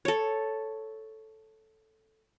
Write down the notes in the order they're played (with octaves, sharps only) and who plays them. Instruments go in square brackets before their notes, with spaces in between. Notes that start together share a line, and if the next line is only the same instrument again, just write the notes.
[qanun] A4 C#5